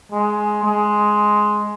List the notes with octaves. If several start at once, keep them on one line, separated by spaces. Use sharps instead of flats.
G#3
G#3